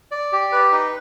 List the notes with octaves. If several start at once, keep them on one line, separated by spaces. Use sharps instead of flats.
D5
G4
B4
D#4